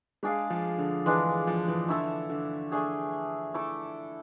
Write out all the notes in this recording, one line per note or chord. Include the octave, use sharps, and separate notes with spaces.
G#3 D4 G#4 D5 F5
F3
D3
E3 G#3 D4 G#4 B4
F3
E3
D3 A3 E4 A4 E5
D3
A3 D4 G#4
A3 E4 A4 D5